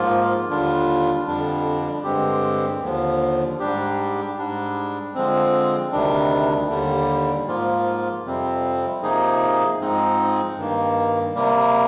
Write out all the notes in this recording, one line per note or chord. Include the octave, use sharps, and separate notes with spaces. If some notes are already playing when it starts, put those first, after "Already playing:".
Already playing: G#2 F3 A#3 F4
D#2 D3 G3 D4 F4
F2 D3 G3 D4
G2 D3 G#3 C4 G4
D#2 D3 F3
G#2 G3 D4 G4
G#2 G3 D4
D3 F3 G#3 C4
D2 C3 D#3 G3 D4
D#2 D3 G3
G#2 F3 A#3 F4
F2 C3 G3 C4
C3 F3 A#3 D#4 G#4
G#2 F3 G#3 C4 D#4
G2 D#3 A#3
C3 G3 A#3